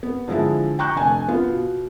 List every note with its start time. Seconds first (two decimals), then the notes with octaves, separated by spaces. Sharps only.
0.03 B3
0.28 D3 F3 G#3 D4 E4
0.79 G5 A#5 C#6 F#6 G6
0.96 F1 D4 G#5
1.28 B3 F4
1.48 B2